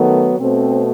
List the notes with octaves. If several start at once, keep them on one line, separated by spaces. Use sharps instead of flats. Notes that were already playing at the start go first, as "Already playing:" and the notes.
Already playing: D#3 F#3 A3 B3
B2 A3 C4